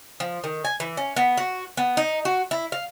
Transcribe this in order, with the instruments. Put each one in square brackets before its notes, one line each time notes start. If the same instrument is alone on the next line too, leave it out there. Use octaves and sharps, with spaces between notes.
[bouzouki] F3
D#3
G#5
E3
C#4
B3
F#4
B3
D#4
F#4
E4
F5